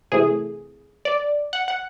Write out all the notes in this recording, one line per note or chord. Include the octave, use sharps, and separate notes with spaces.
C3 E3 A3 G#4
D5
F#5
F#5